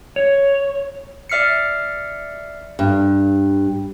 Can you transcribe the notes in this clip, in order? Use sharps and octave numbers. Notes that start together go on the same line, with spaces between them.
C#5
D5 E5 F6 C7 C#7
G2